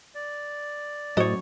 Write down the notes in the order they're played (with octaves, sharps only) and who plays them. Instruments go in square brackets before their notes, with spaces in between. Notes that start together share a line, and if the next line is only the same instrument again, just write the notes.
[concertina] D5
[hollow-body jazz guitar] F#2 C#5 [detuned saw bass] A2 [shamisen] F#4 C5 D#5